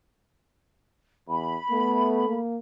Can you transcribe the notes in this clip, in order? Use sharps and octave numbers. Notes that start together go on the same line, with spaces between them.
E2 B5
A3 B3
A#3